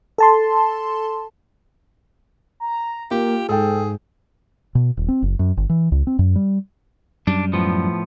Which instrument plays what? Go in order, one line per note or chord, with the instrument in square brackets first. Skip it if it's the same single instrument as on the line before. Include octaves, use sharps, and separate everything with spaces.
[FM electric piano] A4 A5 C6
[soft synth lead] A#5
[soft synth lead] A#3 [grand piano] F4 [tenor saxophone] G4
[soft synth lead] G#2 [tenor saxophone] G#4 [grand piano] A4 G5
[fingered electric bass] B2
D#1
C4
F#1
F#2
G1
E3
C#2
C4
F#2
G3
[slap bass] F#2 G3 [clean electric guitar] D4
[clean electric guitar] A2 F3 B3